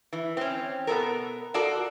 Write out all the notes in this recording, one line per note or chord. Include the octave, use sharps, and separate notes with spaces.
E3
C4 C#4
B2 B3 A4 A#4
F4 F#4 A4 A#4 D5